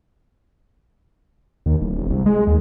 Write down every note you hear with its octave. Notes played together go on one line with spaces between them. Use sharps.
D#2
D1
E1
C2
G#3
D#2